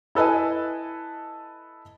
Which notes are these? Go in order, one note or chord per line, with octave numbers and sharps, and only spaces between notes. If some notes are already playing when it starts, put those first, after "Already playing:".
E4 A4 B4 D#5 G#5